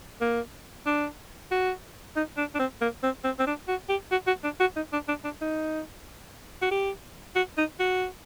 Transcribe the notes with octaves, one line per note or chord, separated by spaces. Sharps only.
A#3
D4
F#4
D#4
D4
D4
C4
A#3
C4
C4
C4
D4
F#4
G4
F#4
F#4
D4
F#4
D#4
D4
D4
D4
D#4
F#4
G4
F#4
D#4
F#4